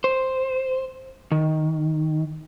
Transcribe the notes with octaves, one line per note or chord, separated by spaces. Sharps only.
C5
D#3